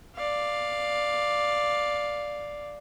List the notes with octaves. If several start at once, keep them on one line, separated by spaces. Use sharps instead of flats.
D5 F5